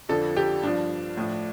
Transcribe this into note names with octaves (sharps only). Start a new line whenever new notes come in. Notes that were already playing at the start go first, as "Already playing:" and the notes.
F2 D3 F3 A4
G4
G2 F3 D4
A2 F3